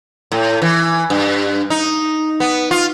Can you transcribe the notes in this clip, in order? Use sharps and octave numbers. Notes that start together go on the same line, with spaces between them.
A2
E3
G2
D#4
B3
F4